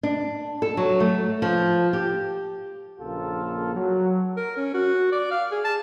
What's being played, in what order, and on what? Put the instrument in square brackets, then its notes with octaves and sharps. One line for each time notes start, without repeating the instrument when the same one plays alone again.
[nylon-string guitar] D4
A4
F#3
A3
F3
G4
[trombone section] A#1 C#3 A#3 F4 A4
F#3
[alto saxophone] A#4
C#4
F#4
D5
F5
G#4
A5